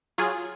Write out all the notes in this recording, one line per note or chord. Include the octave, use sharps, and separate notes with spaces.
F#3 F4 G#4